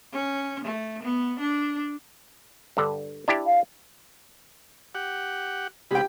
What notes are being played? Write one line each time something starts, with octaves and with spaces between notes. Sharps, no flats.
C#4
A3
B3
D4
G2 D3
D4 E4 G4
F5
G4 F#5
C3 G#3 G4 G5 B5